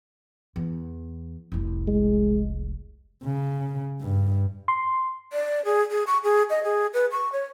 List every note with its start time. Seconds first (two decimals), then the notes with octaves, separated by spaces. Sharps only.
0.56 E2
1.52 F1 C2
1.88 G#3
3.24 C#3
4.01 G2
4.68 C6
5.33 D5
5.65 G#4
5.91 G#4
6.07 C#6
6.24 G#4
6.50 D#5
6.64 G#4
6.94 B4
7.12 C#6
7.32 C#5